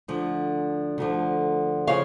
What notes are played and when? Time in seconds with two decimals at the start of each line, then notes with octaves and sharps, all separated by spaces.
0.08 D2 D3 F3
0.98 D2 D3 F3
1.87 C#3 F3 C#5 F5